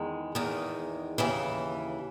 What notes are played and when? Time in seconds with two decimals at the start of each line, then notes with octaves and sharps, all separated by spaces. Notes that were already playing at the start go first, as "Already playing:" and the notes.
Already playing: E2 D#3 G#3
0.35 E2 D#3
1.18 D#2 C#3 E3